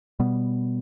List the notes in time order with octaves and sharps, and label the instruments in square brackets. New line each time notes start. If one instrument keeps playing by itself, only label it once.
[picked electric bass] B2 G3 B3